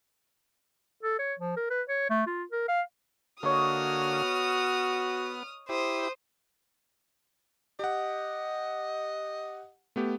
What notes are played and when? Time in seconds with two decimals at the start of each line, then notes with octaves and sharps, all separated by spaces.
1.03 A4
1.19 C#5
1.39 F3
1.57 A#4
1.70 B4
1.89 C#5
2.10 A3
2.27 F4
2.52 A#4
2.68 F5
3.43 D3 A#3 F#4 C#5 D#5 D#6 F6
4.24 B3
5.69 E4 G4 C5 D#6
7.79 G4 D#5 F#5
9.96 A3 B3 G4